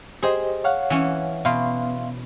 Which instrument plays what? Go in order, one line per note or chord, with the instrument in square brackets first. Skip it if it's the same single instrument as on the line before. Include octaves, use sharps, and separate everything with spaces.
[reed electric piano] G4 C5 D#5 [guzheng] G#4
[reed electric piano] C#5 F5 F#5
[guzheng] E3 C#4
[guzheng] B2 [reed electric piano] E5 F5 C6